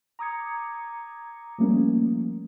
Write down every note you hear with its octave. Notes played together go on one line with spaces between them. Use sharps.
A#5 D6 D#6 G#6 C#7
F3 G3 A3 A#3 C#4